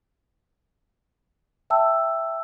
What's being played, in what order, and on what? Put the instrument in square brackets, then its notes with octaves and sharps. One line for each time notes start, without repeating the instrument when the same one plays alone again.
[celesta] E5 G5 A5 E6